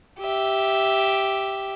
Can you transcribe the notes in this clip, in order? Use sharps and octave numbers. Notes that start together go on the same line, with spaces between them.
G4 E5